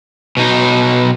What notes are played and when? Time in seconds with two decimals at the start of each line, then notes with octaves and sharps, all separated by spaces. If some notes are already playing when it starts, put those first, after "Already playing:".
0.37 B2 D#4